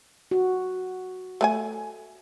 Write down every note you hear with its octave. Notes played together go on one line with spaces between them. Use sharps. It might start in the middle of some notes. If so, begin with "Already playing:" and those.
F#4
A3 B4 G#5